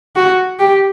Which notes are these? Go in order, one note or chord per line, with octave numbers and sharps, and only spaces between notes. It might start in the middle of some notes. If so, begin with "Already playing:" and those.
F#4
G4